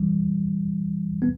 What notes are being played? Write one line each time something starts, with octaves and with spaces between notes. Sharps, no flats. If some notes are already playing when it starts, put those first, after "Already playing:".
Already playing: E3 G3
B3